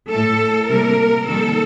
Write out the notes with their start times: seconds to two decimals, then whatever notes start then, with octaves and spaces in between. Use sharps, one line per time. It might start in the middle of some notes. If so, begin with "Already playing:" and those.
0.10 A2 A3 A4
0.68 C3 G3 A#3 A#4
1.27 F2 D#3 G3 A#3 A4